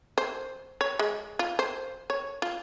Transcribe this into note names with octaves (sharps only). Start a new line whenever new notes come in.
C5
C#5
G#3
F4
C5
C#5
F4